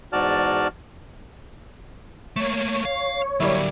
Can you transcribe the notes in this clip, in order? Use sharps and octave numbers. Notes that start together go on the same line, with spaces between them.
E2 G#2 F#4 D5 A5 F6
A3 A#3 C#5
F5
D3 F#3 G3 A#3 E4